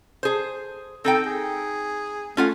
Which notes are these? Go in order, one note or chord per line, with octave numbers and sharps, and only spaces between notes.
G#4 C5
C4 D#4 A4 G5
G#4
A3 C#4 F4 F#5